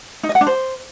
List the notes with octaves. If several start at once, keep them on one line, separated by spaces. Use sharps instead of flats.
D#4
D#5
F#5
D4
C5